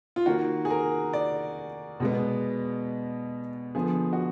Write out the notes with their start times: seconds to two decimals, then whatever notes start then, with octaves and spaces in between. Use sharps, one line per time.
0.16 F4
0.26 D#3 A#3 F#4
0.65 G#4
0.70 A#4
1.13 D5
2.00 B2 G#3 B3
3.75 D3 F3 B3 G#4
4.13 F#4